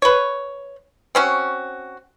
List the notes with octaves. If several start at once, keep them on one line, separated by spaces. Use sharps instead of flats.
B4 C#5
C4 C#4 F#4